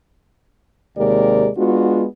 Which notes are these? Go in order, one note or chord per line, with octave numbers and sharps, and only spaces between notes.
D#2 C3 G#3 G4 A#4 D5
G#3 B3 D4 F4 F#4